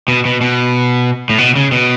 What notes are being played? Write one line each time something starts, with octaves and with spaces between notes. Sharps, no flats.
B2
B2
B2
A2
B2
C#3
B2